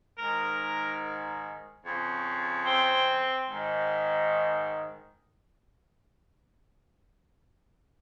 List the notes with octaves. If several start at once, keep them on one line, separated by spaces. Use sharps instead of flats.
G#2 D#3 A#4
F2 C#3
C4
G#2 D#3